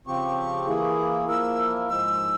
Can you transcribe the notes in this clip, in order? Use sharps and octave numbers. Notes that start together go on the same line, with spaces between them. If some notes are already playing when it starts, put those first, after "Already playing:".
C#3 F3 C4 G4 C#6
E3 A#3 E4 G#4
F3 A#3 E4 A#4 E6
G#2 F3 G#3 E6